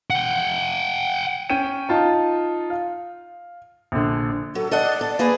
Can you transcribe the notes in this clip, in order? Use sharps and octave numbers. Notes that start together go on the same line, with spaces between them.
F#5 G5
C#4 G5 D#7
D#4 F4 A5
F5
A#1 D3
F#3 A4
A4 D5 D#5 F#5
A4
A#3 G#4 B4